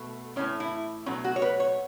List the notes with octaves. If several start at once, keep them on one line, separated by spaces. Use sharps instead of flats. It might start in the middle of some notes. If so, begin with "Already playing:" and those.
Already playing: B2 A3
A2 E3 A3 C#4
E4
B2 F#3 A3 C#4
F#4
C#5
B4
C#5